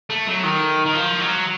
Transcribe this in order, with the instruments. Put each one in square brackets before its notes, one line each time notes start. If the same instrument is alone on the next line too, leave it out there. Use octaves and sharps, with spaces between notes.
[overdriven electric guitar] A3
F#3
D#3
D#3
F3
F#3